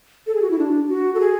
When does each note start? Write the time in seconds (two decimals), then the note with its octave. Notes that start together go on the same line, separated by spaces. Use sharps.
0.27 A4
0.35 G#4
0.42 F#4
0.51 E4
0.59 D4
0.89 F#4
1.15 A4
1.20 G#4